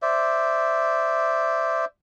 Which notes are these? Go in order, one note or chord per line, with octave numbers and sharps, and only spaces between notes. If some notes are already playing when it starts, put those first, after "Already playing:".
C5 D5 E5